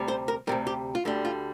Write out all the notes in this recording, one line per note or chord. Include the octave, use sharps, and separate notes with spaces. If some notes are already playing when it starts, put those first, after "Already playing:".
Already playing: D2 C3 G3
C5
A#4
D2 C3 G3 A#4
G4
F4
D2 D3 G3 G4
F4